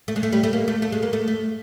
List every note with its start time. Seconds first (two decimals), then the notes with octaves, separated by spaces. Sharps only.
0.08 A3
0.16 G#3
0.23 A3
0.33 G3
0.43 A3
0.53 A#3
0.68 A3
0.82 A3
0.92 G#3
1.02 A#3
1.13 A3
1.28 A3